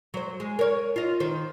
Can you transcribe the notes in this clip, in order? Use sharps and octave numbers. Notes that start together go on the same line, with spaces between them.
F#3 C5
G#3
A#4 C#5
F4 D#5
D#3 C5